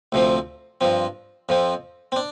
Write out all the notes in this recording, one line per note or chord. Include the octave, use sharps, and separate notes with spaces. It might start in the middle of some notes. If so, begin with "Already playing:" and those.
D2 C3 F3 C4
G2 F3 C4
F2 F3 C4
C4
D4